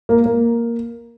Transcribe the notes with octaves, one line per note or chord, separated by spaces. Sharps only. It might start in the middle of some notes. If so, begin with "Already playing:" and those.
A#3
A#3